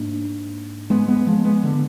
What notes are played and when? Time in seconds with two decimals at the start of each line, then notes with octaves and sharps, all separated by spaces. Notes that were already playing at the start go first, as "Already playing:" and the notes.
Already playing: G#2 A#3 D4
0.90 G#3 B3
1.08 G#3 B3
1.27 F3 G#3
1.45 G#3 B3
1.63 D3